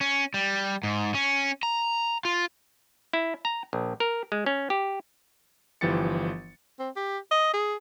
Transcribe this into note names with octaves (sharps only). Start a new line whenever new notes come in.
C#4
G3
G#2
C#4
A#5
F4
E4
A#5
A#1
A#4
G#3
C#4
G4
G1 E3 F3 G4 A6 C#7
C4
G4
D#5
G#4